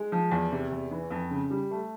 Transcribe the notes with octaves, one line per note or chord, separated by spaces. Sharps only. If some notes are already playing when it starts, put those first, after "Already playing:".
Already playing: G#3
F3
E2
C3
E2
E3
F2
C#3
G3
A3